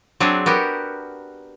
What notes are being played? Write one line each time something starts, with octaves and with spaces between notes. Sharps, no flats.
F#3 C4 D4 G#4
B3 F#4 G4 A#4